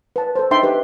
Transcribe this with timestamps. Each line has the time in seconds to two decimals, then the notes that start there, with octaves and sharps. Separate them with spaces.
0.16 B4 A5
0.36 A4 C5
0.51 D4 D#4 E5 G5 C6
0.63 G4 B4